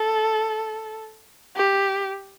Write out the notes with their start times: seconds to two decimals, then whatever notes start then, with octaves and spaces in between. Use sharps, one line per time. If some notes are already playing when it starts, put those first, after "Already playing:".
Already playing: A4
1.56 G4